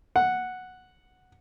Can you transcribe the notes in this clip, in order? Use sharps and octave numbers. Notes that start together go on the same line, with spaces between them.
F#5